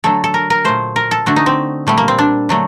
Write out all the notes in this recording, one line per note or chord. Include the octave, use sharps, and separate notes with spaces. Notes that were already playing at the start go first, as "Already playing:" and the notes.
D3 F#3 A3 A4
A4
A#4
A#4
A#2 A3 C5
A#4
A4
D3 A3 F#4
D#4
C4
A#2 G3 A3
A#3
C4
D4
D3 F#3 A3